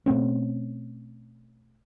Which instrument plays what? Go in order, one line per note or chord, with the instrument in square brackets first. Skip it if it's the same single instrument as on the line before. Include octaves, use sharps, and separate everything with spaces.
[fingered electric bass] B2 A3 C4 C#4